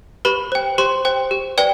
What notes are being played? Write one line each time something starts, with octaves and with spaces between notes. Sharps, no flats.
G4 B4 B5
C5 G5
G4 C5 C6
C5 G5
G4
B4 D5 G5